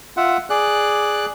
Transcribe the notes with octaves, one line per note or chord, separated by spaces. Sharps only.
F4 E5 F#5
G#4 D5 F#6